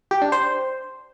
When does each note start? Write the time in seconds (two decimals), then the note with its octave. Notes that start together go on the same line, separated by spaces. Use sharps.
0.11 G4
0.22 D4
0.32 C5